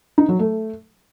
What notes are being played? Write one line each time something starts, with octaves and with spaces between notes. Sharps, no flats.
D#4
F#3
A3